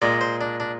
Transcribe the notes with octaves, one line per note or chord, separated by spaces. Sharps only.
A#2 G#3 D5
C5
D4
D4